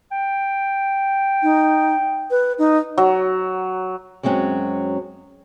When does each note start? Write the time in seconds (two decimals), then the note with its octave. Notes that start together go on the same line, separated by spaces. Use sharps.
0.11 G5
1.43 D#4
2.31 B4
2.59 D#4
2.98 F#3
4.23 F#2 F#3 G#3 C4 C#4